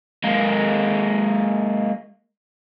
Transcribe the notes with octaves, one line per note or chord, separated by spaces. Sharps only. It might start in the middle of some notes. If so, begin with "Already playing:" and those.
G#3 A#3